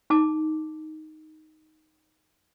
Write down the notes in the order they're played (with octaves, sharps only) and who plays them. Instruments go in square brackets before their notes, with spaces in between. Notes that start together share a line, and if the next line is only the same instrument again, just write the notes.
[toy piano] D#4 A5 D6